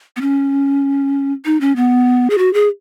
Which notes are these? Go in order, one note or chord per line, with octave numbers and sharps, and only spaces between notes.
B3
C#4
D#4
C#4
B3
G#4
F#4
G#4